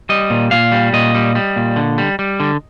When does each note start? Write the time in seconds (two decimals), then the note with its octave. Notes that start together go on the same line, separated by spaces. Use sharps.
0.09 G3 D#5
0.30 A#2
0.51 A#2 F5
0.72 G3
0.93 A#2 D#5
1.15 G3
1.35 G3
1.56 A#2
1.76 D3
1.98 G3
2.19 G3
2.40 D3